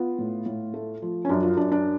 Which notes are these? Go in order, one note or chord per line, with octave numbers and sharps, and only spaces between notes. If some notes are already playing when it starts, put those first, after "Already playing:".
Already playing: B3 F4
A2
A2
A3
F3
C#4
F#2 D4
F4
F#2 D4
D4